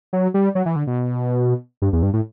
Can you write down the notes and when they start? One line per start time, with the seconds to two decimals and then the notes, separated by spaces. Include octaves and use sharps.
0.13 F#3
0.34 G3
0.55 F#3
0.66 E3
0.76 D3
0.87 B2
1.82 G2
1.93 E2
2.03 G2
2.13 A2